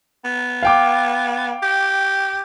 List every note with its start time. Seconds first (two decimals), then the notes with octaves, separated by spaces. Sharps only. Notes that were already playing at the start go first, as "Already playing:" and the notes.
0.25 B3
0.63 F5 G5 D6
1.63 G4